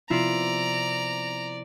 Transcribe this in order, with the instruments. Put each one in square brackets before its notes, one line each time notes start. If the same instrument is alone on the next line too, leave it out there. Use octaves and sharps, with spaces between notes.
[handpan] C3 F3 B3 [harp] E4 F4 [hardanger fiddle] D5 [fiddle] A#5